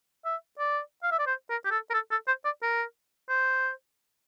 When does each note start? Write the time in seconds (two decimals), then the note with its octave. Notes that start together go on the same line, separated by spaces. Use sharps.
0.25 E5
0.59 D5
1.03 F5
1.11 E5
1.19 D5
1.26 C5
1.49 A#4
1.65 G4
1.71 A4
1.90 A#4
1.94 A4
2.11 A4
2.27 C5
2.45 D5
2.62 A#4
3.29 C5